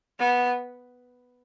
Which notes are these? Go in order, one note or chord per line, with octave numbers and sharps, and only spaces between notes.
B3